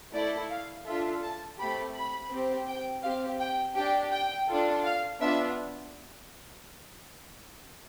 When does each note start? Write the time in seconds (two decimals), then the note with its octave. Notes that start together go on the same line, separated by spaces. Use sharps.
0.13 A3 E4 A4 D5
0.50 F5
0.86 D4 F4 A4 E5
1.22 A5
1.59 A3 C4 G4 B5
1.95 B5
2.31 C4 G4
2.67 G5
3.03 C4 G4 F5
3.40 G5
3.76 D4 G4 G5
4.11 G5
4.48 D4 F4 A4
4.84 F5
5.21 B3 D4 F4 E5